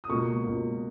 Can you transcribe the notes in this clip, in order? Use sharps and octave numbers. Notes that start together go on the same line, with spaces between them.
D#6
C#2 B2 A#3 C#6
C#2 B2 A#3